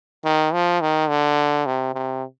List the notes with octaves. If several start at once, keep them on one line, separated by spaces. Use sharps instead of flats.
D#3
F3
D#3
D3
C3
C3